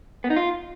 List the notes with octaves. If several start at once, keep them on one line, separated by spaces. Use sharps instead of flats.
B3
D#4
F4